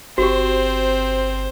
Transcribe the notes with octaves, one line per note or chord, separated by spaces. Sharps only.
G1 C4 F#4 G4 C5